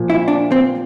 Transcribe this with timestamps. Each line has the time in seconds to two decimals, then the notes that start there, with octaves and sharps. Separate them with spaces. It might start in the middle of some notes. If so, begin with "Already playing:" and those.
Already playing: A#2 F3 A#3
0.10 E4
0.28 D4
0.52 C4